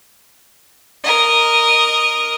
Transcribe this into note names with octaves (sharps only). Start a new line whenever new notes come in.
A#4 D#5